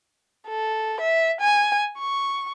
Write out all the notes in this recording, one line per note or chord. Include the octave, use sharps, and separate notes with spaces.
A4
E5
G#5
C#6